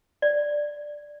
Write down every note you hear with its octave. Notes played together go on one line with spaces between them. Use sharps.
D5